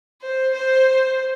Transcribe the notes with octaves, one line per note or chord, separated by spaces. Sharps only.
C5
C5